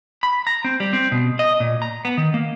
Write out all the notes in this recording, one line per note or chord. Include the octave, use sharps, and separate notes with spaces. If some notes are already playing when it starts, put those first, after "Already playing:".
B5
A#5
C4
G3
C4
B2
D#5
A#2
A#5
B3
D#3
A#3